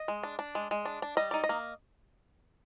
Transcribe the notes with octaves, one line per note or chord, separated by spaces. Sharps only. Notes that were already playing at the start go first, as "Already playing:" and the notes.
Already playing: D#5
G#3
D4
D4
G#3
G#3
D4
D4
G3 D#5
D#4 D5
D#5
A#3